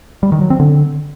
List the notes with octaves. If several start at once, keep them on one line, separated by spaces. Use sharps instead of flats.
G3
D#3
F#3
C4
D3